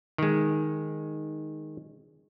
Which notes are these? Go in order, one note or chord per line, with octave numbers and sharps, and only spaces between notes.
D#3 G#3